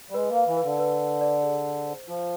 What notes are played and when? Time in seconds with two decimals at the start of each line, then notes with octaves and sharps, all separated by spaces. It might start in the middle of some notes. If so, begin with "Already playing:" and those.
0.10 G3
0.14 G#3 B4
0.30 A#3
0.36 F5
0.47 E3
0.56 B4
0.62 D3
0.79 B4
1.00 B4
1.21 D5
1.43 G#4
1.64 G#4
1.86 C5
2.08 F3 F4